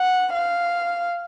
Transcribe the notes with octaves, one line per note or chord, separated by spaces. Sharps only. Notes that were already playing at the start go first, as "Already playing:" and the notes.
Already playing: F#5
F5